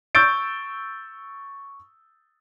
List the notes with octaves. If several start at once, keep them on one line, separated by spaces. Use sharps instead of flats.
C#6 E6 G6 A6 D7